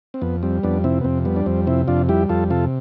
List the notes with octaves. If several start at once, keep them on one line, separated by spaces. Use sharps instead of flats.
C4
F2 B3
G3 C4
F2 B3 D4
C3 C4 E4
B3
F2 C4
G3 B3
D4
F2 C4
C3 C4 E4
F2 D4 F4
G3 E4 G4
F2 F4 A4
C3 F4 A4